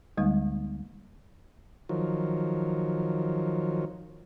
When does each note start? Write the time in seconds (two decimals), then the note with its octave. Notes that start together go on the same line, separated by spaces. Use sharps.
0.17 D2 D3 G3 G#3 A#3 D#4
1.89 D#3 F3 F#3